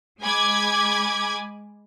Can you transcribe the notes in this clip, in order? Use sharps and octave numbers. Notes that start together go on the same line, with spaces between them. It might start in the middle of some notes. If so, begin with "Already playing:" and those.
G#3 G#5 B5 D6 G#6